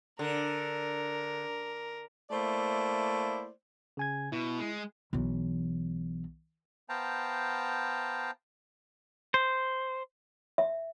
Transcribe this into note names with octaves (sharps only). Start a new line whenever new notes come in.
D3 A#4
A3 A#3 E4 C5 D5
C#3 G#5 G#6
B2 E4
G#3
B1 E3
B3 C5 F5 G5 A5 A#5
C5
E5